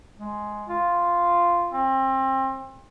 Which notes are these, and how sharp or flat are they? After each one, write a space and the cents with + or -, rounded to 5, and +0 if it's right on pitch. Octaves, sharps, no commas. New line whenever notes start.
G#3 +10
F4 -5
C4 +30